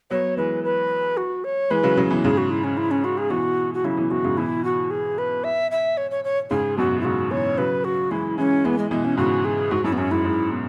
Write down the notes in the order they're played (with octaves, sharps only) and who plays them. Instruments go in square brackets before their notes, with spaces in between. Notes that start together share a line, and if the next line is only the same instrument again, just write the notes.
[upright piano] F#3 B3 [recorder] C#5
[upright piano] E3 G#3 [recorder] B4
[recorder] B4
F#4
C#5
[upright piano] E3 G#3 [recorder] B4
[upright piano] C#3 F#3
C#3 F#3
B2 E3
[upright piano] G#2 C#3 [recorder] G#4
[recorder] F#4
E4
C#4
E4
C#4
F#4
G#4
[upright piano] B2 E3 [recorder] F#4
[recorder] F#4
[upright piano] C#3 F#3 [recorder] E4
[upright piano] B2 E3
[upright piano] B2 E3 [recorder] F#4
[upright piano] G#2 C#3
[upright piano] B2 E3 [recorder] E4
[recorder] F#4
G#4
B4
E5
E5
C#5
C#5
C#5
[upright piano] G#2 C#3 [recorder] G#4
[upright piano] F#2 B2 [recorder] F#4
[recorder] E4
[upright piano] G#2 C#3 [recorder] F#4
[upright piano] B2 E3 [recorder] C#5
[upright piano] C#3 F#3 [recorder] B4
[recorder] F#4
[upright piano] E3 G#3 [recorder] E4
[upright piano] E3 G#3 [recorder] C#4
[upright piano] E3 G#3 [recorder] B3
[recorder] G#3
[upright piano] B2 E3 [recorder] G#3
[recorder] C#4
[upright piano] G#2 C#3 [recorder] F#4
[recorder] G#4
[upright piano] G#2 [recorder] F#4
[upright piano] F#2 [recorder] E4
[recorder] B3
[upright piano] F#2 [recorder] C#4
[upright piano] G#2 [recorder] E4
[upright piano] G#2
B2